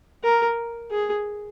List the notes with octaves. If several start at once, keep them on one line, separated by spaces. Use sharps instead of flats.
A#4
G#4